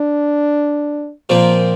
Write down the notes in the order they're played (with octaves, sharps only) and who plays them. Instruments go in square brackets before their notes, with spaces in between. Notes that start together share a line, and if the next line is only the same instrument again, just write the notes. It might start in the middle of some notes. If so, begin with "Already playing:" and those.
Already playing: [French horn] D4
[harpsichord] A#2 F3 C4 [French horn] A#3